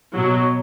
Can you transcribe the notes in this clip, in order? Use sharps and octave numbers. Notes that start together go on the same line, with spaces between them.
B2 F#3